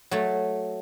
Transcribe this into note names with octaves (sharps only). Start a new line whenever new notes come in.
F#3 A3